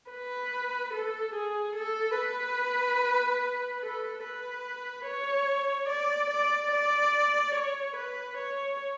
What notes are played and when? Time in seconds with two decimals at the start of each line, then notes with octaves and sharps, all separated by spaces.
0.11 B4
0.93 A4
1.34 G#4
1.76 A4
2.18 B4
3.83 A4
4.24 B4
5.06 C#5
5.89 D5
6.31 D5
6.72 D5
7.55 C#5
7.96 B4
8.38 C#5